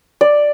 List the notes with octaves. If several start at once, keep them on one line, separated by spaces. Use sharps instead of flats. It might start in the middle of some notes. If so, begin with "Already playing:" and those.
D5